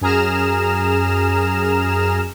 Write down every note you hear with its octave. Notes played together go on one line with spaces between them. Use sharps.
F#2 G#4 A#5 F6 E7